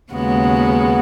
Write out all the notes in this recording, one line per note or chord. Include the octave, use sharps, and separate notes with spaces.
D#2 C#3 G#3 B3 F#4